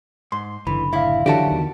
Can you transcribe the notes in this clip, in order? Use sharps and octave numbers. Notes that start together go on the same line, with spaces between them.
G#2 C6
F#1 A#2 D3 E3 B5
A2 E4 E5 F5
D3 E3 F#3 F#4 G4 A5
E2 D#3